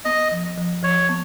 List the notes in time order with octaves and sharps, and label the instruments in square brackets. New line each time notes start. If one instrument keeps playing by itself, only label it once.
[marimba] B3 [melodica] D#5
[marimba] F3
F3
[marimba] F3 [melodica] C#5
[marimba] B3